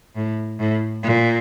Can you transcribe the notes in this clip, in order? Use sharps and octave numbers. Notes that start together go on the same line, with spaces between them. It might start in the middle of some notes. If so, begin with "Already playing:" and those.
A2
A2
A#2